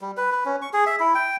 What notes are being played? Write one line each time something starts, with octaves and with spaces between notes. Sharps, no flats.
G3
B4
B4
C#4
C#6
G#4
E5
E4
G5